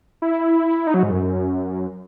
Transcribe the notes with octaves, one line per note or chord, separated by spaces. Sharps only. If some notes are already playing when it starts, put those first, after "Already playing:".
E4
D#4
F#3
G#2
F#2